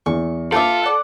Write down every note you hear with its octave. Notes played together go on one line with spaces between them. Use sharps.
E2 C#6
F4 A4 E5 F5 G5 A5 D6
D5 F#5